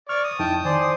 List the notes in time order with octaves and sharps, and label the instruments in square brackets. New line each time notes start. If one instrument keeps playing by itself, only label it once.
[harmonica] D5 C#6 [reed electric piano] F6
[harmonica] D#6
[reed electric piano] F2 D#4 E4 [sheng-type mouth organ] G5 A5
[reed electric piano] D#3 G#5 [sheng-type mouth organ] C5 D5